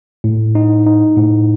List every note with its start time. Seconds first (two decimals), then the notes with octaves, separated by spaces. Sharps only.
0.24 A2
0.55 D#4
0.86 D#4
1.17 A2